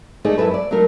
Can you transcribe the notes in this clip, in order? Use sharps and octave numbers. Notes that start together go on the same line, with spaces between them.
A3 D#4 G#4 D5
F#2 E4 A4 B4
D5
F#3 A3 D4 D#4 A#4